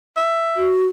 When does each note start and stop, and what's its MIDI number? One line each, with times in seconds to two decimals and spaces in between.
0.17 0.72 76
0.56 0.86 66